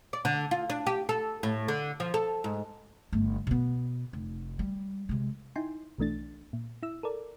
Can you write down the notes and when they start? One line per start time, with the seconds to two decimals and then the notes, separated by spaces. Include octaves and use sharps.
0.13 D5
0.25 D3
0.51 F4
0.70 D4
0.87 G4
1.09 A4
1.43 A2
1.68 D3
2.00 F3
2.14 A4
2.44 G#2
3.13 G1 A3
3.47 B2 B3
4.13 F1
4.59 G3
5.09 C3 G#3
5.56 D#4 E4 G5 G#5 C6
5.98 B1 E3 A3 D4 A6
6.53 A#2
6.83 E4 E6
7.03 A4 A#4 D5